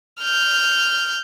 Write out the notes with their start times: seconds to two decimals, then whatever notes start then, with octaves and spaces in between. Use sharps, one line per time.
0.21 F6 G6